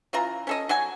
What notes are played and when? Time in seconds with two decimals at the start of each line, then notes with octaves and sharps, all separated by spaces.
0.13 C#3 E3 F4 A#5
0.47 C#4 A4 D#5
0.69 F#3 F#4 G#5